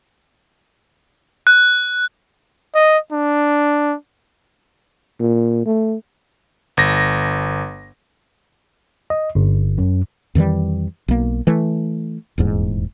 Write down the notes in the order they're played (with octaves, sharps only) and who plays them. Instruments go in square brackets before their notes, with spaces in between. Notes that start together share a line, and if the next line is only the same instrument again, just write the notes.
[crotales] F#6
[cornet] D#5
D4
[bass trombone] A#2
A3
[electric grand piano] G1 A#6
[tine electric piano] D#5
G1
F#2
[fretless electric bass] F2 D#3 E3 G3
B1 A#3
E3 A3
D#1 E2 G#2